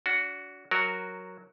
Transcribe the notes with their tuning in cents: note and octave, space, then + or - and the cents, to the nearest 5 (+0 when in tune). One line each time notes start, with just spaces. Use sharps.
D4 -40 F#4 +0
F#3 +0 F#4 +0 A#4 +0